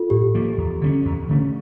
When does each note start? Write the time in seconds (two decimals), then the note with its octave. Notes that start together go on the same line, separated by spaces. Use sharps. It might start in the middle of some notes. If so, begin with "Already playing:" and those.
Already playing: F4 A4
0.10 A2 G4
0.35 F3 A#3
0.58 E2
0.81 D3 A3 C#4
1.05 E2
1.29 D3 A3 C#4